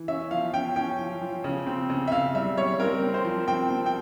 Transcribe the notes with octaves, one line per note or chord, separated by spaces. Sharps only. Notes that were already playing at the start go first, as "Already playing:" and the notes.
Already playing: E3
C#4 E5
F3 F5
C#4 G5
C#4 G5
F3
F3
C#3
C4
C#3
E5
C#3 F5
G3 E5
G3 C#5
C4 A#4
C4
C5
F3
C4 G5
C4
G5